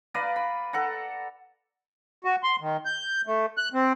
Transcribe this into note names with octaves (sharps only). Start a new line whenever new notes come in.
B4 D5 F5 A#5
B5
A4 F#5 A#5
F#4
C6
D#3
G6
A3
F#6
C4